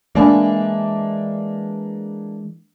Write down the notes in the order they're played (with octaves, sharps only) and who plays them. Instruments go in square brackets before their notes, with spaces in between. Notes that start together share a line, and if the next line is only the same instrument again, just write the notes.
[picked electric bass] E3 G#3 [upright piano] A#3 D4